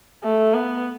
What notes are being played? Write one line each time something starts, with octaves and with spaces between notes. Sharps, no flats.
A3
B3